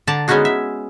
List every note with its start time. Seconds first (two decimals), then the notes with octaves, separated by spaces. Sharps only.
0.07 D3 D5 A5 A#5
0.28 G#3 B3 C#4 D#4 F#4 G#4
0.45 E5